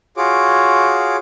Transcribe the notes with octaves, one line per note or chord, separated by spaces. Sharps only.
F4 F#4 G#4 C#5 D6